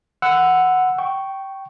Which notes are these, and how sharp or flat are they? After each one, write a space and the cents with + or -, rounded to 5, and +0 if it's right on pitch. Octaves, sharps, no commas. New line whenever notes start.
F#5 +0 B5 +45 E6 +0
G5 -15 C#6 +0